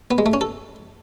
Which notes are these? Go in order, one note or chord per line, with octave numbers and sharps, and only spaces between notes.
B3
G#3
A3
C#4
A4